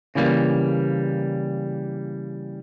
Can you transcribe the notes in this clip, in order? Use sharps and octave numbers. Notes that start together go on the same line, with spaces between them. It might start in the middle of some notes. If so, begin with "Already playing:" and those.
C#3 E3 G3 A#3